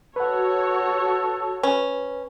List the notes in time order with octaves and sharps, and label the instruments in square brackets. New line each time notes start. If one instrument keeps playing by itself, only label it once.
[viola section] F#4 C#5 [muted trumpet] A4 [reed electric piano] B4 F#5
[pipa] C#4 [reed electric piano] B4